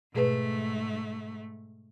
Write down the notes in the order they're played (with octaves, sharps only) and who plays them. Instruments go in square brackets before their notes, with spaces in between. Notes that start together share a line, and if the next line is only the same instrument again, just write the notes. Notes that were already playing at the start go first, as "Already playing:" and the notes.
[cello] G#2 A3 [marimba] B2 G#4 B4